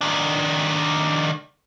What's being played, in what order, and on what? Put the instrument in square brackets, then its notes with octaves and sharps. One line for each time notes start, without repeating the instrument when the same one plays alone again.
[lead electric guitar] D#3 D4